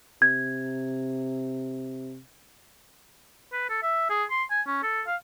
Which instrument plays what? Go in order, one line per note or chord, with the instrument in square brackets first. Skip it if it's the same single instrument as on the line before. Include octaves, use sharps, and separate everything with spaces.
[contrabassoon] C3 [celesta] G#6
[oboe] B4
A4
E5
G#4
C6
G#5
C#4
A4
F5